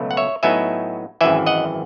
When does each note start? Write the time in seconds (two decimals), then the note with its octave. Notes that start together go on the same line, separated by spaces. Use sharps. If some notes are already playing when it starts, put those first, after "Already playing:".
Already playing: C#2 B2 F#3 A3
0.11 F#5
0.17 C#5 E5
0.43 A2 F#3 B3 D#4 E5 G#5
1.21 G#1 F#2 E3 E5 G#5
1.46 D#5 F#5